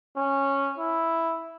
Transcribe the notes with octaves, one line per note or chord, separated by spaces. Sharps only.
C#4
E4